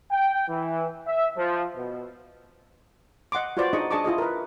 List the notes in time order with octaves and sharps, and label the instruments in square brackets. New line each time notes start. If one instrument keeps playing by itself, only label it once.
[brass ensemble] G5
E3
E5
F3
B2
[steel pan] D#5 F#5 C6 D6
F4 F#4 B4 C5 D5
D4 D#4 G#4 D#5 C#6
D4 G#4 D#5 A5 C#6 D6
E4 F4 G#4 D#5
A#4 B4